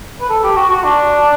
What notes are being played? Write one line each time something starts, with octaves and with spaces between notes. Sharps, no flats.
B4
A4
G4
F#4
F#4
D4